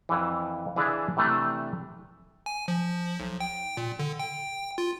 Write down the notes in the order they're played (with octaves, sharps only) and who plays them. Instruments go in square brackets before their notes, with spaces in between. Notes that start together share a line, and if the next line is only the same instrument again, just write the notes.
[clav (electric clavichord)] F2 E3
E3 D4 G#4 D5 E5 A5
C3 E3 A3 D4
[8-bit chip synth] G#5
F3
B1
G5
A#2
D3
G5
F4